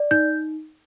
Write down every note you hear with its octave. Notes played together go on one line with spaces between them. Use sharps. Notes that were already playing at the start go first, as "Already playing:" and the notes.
Already playing: D5
D#4 G6